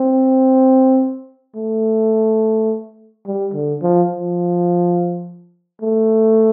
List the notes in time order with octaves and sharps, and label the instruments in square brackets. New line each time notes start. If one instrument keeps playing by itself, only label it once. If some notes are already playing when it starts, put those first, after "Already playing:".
Already playing: [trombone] C4
A3
G3
D3
F3
F3
A3